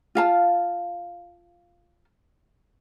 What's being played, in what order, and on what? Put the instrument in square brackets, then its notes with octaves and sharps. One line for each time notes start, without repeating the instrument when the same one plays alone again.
[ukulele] F4 F5 A5